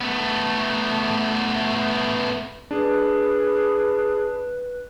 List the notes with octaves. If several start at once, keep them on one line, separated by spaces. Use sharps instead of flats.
A3 B3
D4 G#4 B4